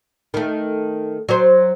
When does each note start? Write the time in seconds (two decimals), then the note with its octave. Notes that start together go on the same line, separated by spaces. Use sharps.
0.34 D#3 A3
1.29 F#3 C5